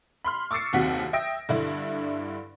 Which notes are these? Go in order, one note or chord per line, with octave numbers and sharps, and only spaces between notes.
B5 C6 F6
C#6 D6 E6 A6 C7 C#7
F#1 D#2 C3 F#4 F#5 B6
E5 G5 D#6 A#6 D7
G2 D3 D4 E4